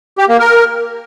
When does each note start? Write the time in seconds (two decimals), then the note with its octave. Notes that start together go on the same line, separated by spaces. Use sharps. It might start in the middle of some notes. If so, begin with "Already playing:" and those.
0.18 G4
0.29 A#3
0.39 A#4